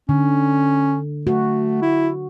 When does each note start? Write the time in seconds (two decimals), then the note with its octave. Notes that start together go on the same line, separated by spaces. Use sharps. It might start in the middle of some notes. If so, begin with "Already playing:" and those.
0.09 D3 C#4
1.27 A3 F#4
1.82 E4